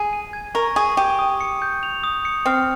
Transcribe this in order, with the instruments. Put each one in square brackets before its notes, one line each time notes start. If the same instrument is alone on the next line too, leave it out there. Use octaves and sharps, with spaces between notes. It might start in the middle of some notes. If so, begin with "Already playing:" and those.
Already playing: [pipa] G#4
[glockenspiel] D#7
G#6
[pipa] A#4 [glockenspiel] C#6
[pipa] G#4 [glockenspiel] C#6
[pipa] G4 [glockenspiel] D#7
[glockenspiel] D#6
C#7
G6
F7
D#6
C#7
[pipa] C4 [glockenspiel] F6